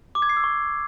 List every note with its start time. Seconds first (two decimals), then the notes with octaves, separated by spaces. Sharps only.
0.15 D6
0.22 G#6
0.29 C7
0.37 E6
0.44 C#6